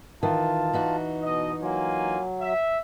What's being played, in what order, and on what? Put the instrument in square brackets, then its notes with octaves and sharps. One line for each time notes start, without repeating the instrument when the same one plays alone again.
[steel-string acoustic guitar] D#3 E3 [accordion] F4 A5
[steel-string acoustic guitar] E3 D#4 F#4
[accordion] B2 [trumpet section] D#5
[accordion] F#3 [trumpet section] A#3 F4 G#5
[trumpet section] E5